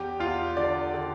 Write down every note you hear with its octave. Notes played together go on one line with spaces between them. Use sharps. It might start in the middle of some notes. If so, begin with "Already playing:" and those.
Already playing: E2 G4
E2 F4
D3 D5
D3